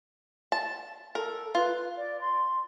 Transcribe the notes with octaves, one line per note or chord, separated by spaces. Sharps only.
A5
A4 A#4
F4 B4
D5
C6